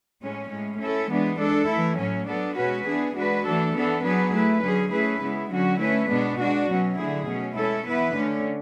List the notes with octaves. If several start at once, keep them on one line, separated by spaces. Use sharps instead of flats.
A2 G#3 C#4
A2 G#3 C#4
A3 C#4 E4 A4
E3 G#3 B3 D4
G#3 D4 A4
E3 A3 E4
A2 F#3 C#4
F#3 B3 D4 A4
B2 G#3 C#4 F#4 B4
E3 B3 D4 G#4
G#3 D4 F#4 B4
E3 A3 D4 A4
E3 B3 D4 A4
F#3 B3 D4 G#4 B4
A3 E4 B4
D3 F#3 C#4 G#4
A3 C#4 E4 G#4 B4
C#3 G#3 B3 E4
D3 F#3 C#4 F#4
A3 C#4 E4 B4
B2 G#3 B3 D4
G#3 D4 F#4
B2 F#3 C#4
D3 F#3 A3 E4 G#4
B2 F#3 C#4
G#3 C#4 E4 A4
E3 B3 E4 B4
D3 A3 C#4